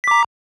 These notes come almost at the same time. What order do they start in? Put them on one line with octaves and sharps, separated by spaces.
B6 D6 A#5